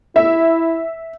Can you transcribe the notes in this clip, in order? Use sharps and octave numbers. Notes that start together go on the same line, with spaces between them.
E4 E5